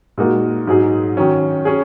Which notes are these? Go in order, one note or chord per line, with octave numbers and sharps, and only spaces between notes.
A#2 G#3 D#4 F#4 A#4
G#2 F#3 D#4 G#4
D#3 F#3 C#4
C#4 G#4